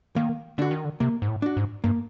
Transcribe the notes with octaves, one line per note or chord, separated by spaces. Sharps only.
D#3 A#3
D3 D4 F#4
D#3
D3
C3 A#3
G#2
A2
D4 F#4
G#2
G2 A#3